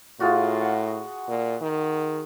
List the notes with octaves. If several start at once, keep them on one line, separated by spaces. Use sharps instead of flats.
A2 G#3 F4 F#4
F#5
A#2
D#3